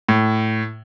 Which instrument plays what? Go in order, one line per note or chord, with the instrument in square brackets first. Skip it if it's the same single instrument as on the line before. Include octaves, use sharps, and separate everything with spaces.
[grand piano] A2